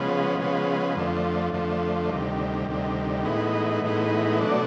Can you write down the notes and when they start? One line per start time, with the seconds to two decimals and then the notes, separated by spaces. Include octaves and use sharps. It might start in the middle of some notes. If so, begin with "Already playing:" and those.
Already playing: C#3 F3 G#3 B3
0.38 C#3 F3 G#3 B3
0.96 F2 D3 F3 A3
1.53 F2 D3 F3 A3
2.10 D2 C3 D#3 G3
2.68 D2 C3 D#3 G3
3.25 A2 E3 G#3 B3 D#4
3.83 A2 E3 G#3 B3 D#4
4.40 B2 F#3 A3 D4